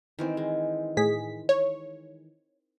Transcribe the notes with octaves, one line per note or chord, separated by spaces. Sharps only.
D#3 E3 C4
G#3
A2 G#4 B6
C#5